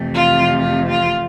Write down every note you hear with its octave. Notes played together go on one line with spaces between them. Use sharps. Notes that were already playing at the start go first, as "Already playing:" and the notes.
Already playing: F2 C3 E3 A3
F4
F4
F4